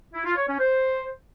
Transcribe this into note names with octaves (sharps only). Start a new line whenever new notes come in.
E4
F4
C#5
C#4
C5